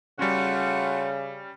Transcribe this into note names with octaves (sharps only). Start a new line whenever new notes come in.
C#3 G3 A3 C#4 F4 F#4